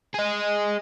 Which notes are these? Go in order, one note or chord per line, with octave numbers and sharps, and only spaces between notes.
G#4 D#5